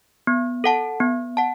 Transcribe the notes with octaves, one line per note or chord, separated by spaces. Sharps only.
B3
A4 F#5 A5
B3
F#5 A5